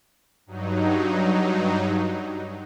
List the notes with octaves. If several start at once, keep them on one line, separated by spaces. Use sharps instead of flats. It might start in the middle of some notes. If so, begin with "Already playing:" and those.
G2 F#3 D#4